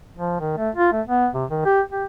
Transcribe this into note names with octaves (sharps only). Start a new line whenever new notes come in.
F3
D#3
A3
F4
A3
B3
C3
D#3
G4
G4